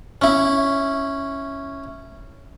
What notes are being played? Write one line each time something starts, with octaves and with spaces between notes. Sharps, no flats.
C#4 E4